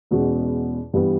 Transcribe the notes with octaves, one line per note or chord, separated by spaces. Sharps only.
E2 B2 G#3 C#4 F#4
G2 E3 G3 B3